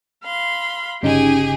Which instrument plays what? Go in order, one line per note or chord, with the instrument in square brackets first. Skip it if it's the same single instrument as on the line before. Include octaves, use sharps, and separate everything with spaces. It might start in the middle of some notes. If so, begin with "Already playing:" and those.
[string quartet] F5 B5 C6
[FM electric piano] G1 C#3 D#4 [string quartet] G4 G#4 G#5